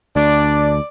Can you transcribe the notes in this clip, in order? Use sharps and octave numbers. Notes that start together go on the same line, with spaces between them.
D2 D4 D5